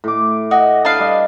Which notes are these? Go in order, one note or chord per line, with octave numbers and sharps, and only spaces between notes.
A2 D6
F#4 D#5
D4 B4 F5
G3 D#5